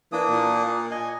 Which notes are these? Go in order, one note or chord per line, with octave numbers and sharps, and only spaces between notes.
E3 A#3 D4 D#6
A#2
D#5 G#5